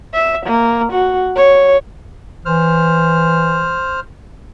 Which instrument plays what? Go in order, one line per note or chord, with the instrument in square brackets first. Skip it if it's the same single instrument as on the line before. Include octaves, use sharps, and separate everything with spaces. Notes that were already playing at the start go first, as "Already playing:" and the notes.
[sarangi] E5
A#3
F#4
C#5
[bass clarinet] E3 [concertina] C5 F6